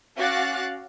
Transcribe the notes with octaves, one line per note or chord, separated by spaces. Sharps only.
C#4 F#4 F5 D6 F#6 A6